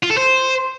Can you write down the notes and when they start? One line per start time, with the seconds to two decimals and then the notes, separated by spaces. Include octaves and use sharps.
0.03 F4
0.10 A4
0.18 C5